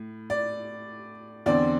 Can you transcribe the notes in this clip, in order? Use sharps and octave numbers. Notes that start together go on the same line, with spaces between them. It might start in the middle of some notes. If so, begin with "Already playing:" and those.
Already playing: A2
D5
E2 D3 C4 D5